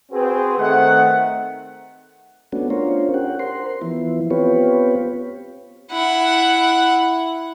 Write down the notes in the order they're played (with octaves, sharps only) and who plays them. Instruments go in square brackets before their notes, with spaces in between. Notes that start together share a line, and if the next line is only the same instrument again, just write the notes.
[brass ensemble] C4 F#4 G#4 B4
D#3 A3 C4 F#5
[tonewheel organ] A3 B3 C#4 D4 F#4
C#4 D4 F4 A#4 C5 C#5
G4 F#5
A#4 C5 C6
E3 F3 B3 E4
B3 C4 F4 G4 B4 C#5
[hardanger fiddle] E4 F#5